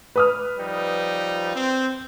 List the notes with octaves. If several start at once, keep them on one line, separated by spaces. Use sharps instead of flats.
B4 D#6 F6
F3 G3 D#4
C4